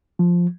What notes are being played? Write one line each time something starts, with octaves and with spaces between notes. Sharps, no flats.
F3